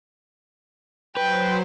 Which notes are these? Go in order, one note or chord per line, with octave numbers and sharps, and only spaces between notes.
F#3 B4 C5 G5